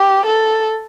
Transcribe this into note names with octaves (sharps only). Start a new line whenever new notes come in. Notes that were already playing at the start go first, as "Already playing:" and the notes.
Already playing: G4
A4